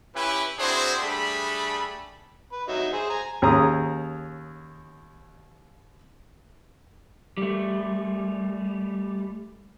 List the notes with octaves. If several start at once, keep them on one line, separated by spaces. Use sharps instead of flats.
C#4 E4 G4 B4
C4 D4 E4 F#4 G#4 C5
G3 A3 D4 G#4 B5
B4
F#3 D#4 E5
G#4 C5
G#5 A#5
D#2 C#4 G#4 A#5 D#6
G3 A3